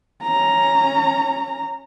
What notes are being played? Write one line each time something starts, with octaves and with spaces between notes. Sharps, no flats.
C#4 A#5